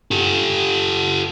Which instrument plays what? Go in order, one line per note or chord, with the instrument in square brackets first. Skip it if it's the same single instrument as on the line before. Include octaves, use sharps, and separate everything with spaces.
[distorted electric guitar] G4 A4